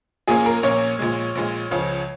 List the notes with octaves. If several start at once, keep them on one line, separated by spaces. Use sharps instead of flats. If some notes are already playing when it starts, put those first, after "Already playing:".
A#1 A#2 A#3 C#4 G#4
A#4
A#1 A#2 A#3 C#4 C#5
A#1 A#2 G#3
A#1 A#2 G#3
C#2 C#3 F3 C#4